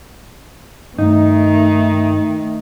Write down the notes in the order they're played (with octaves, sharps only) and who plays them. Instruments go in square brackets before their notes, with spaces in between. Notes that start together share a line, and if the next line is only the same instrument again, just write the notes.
[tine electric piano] G2 [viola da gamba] D#3 [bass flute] A3 [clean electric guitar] D#4